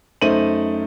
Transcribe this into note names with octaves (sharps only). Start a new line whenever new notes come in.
F#2 A3 D#4 C5 D#7 F#7